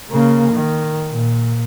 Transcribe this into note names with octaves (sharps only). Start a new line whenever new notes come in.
C#3 A#3
D#3
A#2